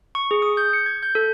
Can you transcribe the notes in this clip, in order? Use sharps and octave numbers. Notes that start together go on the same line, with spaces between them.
C#6
G#4
D#6
G6
C#7
G#6
G6
A4